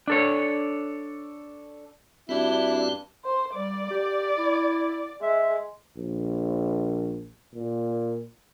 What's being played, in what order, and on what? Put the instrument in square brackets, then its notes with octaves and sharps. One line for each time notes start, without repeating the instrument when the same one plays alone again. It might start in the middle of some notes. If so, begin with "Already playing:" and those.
[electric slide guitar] D4 A4 C#5
[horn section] G2 G3 D4 [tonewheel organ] C4 F#4 [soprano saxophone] E4
[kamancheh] C5
[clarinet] G3 [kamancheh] D5
[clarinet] G4
E4
[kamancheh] G#3 [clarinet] E5
[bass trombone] A#1
A#2